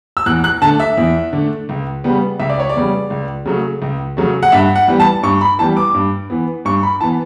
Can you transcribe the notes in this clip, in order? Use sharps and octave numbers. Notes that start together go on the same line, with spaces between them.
E6
E2 F#6
F#6
D3 A3 A5
E5
E2
D3 A3
C#2
C#3 G3 B3
C#2 E5
D5
C#5
D5
C#3 G3 B3
C#2
C#3 F#3 A3
C#2
C#3 F#3 A3
F#5
G2 E5
F#5
E3 G3 B3
A5
G2 C#6
B5
E3 G3 B3 A5
D6
G2
E3 B3
G2 C#6
B5
E3 B3 A5